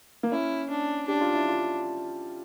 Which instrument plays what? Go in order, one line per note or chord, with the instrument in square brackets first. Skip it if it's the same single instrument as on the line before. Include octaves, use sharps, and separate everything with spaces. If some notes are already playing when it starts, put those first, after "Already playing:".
[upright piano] A#3
[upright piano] C#4 [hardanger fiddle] E4
[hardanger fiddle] D4
[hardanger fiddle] D4 [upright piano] G4
[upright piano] F4
E4
F4